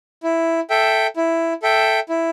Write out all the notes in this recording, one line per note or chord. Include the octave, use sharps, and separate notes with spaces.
E4
A4 E5 G5
E4
A4 E5 G5
E4